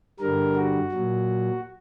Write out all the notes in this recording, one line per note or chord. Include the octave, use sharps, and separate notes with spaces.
G2 D3 G3 A#4
F#4
A#2 F#3